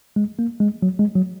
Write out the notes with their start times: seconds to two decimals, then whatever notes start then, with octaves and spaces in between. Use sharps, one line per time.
0.16 G#3
0.39 A#3
0.60 G#3
0.82 F#3
0.99 G#3
1.16 F#3